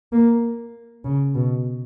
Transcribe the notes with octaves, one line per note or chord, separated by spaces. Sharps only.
A#3
C#3
B2